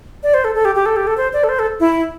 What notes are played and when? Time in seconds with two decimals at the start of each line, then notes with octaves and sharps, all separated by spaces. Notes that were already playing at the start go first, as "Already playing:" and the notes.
0.23 D5
0.34 C5
0.44 A4
0.55 A4
0.65 G4
0.75 G4
0.86 A4
0.96 G4
1.07 A4
1.17 C5
1.33 D5
1.44 A4
1.49 C5
1.59 A4
1.80 E4